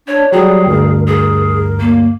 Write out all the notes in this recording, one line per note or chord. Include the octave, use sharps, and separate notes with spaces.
D4 C#5
F#3 G3 G#4 G5
D2 G2 A#4
G#4 A#4
A#3